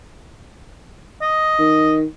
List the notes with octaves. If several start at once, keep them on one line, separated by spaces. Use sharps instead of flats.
D#5
D#3